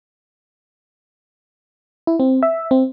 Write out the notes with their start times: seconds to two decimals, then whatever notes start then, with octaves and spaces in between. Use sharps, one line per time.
2.07 E4
2.20 C4
2.43 E5
2.71 C4